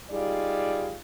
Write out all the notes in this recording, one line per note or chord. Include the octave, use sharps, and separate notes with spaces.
G3 D#4 F4 G#4 D5